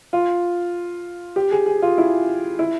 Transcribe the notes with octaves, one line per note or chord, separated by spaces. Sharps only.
F4
G4
G#4
G#4
F4
E4
E4